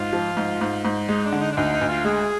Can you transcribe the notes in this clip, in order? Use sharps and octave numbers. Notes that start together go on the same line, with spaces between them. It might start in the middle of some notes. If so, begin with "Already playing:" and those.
Already playing: G#2 F4
F3
G#2
G#2
G#2
G#3 D#4
D4
D3
D#4
D4
D2 D#4
D#4
D2
F4
G#3 G#4